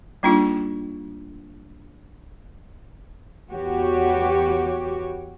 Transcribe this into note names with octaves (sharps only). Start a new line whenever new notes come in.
G3 A#3 D4 D#4 F4 G#4
E2 B3 F#4 G4 C#5